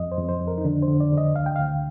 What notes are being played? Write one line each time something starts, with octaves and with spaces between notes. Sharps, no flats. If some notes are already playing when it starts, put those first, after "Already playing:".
Already playing: F2 D#5
C5
F2
C5
F2
A#4
D#4
D3 D4
C5
D3
D5
D3 D#5
D2 F5
G5
D2 F5